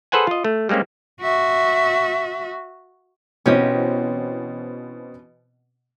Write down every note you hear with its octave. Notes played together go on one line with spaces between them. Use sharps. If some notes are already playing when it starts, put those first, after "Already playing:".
G#4 A4 B4 C5 F#5 G#5
F4 D#5
A3
G3 G#3 A#3 C4 C#4
F#4 E5
B2 E3 C4 C#4 G4 D#5